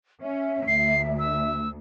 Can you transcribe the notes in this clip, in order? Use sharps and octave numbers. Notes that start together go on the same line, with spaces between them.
C#4 E5
D2 C7
E6